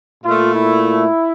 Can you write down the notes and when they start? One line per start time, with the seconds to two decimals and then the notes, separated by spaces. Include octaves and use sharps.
0.24 A#2 A3 F4
0.54 E4